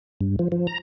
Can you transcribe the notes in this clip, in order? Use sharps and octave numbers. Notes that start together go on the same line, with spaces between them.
G2
F3
F3
A#5